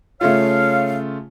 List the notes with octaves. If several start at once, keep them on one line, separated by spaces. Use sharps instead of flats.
C#3 A3 F4 C#5 F5